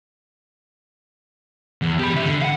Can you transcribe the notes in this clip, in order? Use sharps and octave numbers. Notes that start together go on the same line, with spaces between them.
E2
G4 B5
C#3 E5
D3
F5 F#5